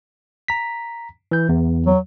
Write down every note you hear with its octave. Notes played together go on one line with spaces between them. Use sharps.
A#5 B6
E3 G6
E2
F#3